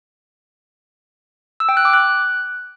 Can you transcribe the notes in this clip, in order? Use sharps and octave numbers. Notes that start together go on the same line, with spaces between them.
E6
G5
F#6
D6
F#6